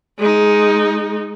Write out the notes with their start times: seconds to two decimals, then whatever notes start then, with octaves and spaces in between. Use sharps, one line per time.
0.18 G#3 D#4